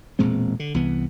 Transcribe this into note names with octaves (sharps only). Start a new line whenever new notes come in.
E1 A#2 G#3 C4
D3
C2 E3 B3